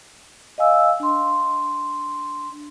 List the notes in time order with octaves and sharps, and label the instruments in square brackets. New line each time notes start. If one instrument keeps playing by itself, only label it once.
[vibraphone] D#5 F5 G#5 E6
D4 C6